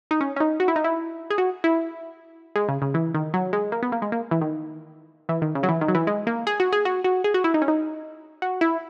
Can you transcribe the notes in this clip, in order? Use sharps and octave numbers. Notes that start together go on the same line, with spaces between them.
D#4
C#4
C#4
D#4
F#4
E4
D#4
E4
G#4
F#4
E4
G#3
C#3
C#3
E3
D#3
F#3
G#3
A#3
B3
A#3
G#3
A#3
E3
D#3
E3
D#3
C#3
F#3
E3
D#3
F#3
E3
G#3
A#3
G#4
F#4
G#4
F#4
F#4
G#4
F#4
E4
D#4
C#4
D#4
F#4
E4